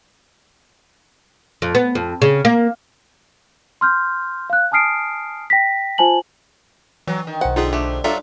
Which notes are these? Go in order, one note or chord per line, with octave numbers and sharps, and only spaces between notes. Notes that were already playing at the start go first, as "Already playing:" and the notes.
F2
B3
F2
C#3
A#3
C6 F6 G6
F5 F#6
G#5 A5 D#6 F6 C7 D7
G5 A#6 B6
F4 C5 G#5 A5 F#7
E3 F#3
D#3
B1 C5 F#5
D3 D#4 F4 G#4
A3 G4
G2 F#3 D4 F4 A4 E5 A#5